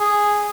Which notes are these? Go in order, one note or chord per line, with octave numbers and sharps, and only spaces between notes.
G#4